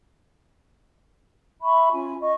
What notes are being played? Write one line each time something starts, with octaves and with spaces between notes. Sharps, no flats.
E5 B5 C#6
C#4 F4 G#5
D#5 C#6